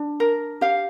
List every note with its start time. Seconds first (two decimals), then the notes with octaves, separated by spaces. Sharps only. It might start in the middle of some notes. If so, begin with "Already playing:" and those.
Already playing: D4
0.20 A#4
0.61 G4 F5